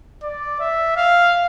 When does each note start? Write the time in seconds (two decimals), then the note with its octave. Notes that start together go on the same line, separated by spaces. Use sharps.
0.23 D5
0.60 E5
0.97 F5